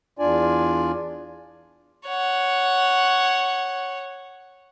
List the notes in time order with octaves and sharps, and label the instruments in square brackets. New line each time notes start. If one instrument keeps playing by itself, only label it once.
[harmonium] E2 D4 F4 D5 G#5
[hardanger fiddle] C#5 F#5